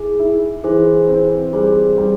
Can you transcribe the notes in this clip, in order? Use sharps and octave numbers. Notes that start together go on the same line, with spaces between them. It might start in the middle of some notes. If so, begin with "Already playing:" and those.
Already playing: E4 G#4
E4
E3 G#4 C5
C4
G3 G#4 C5
G3